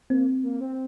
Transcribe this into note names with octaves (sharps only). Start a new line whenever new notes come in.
A#3 C4
A#3
C4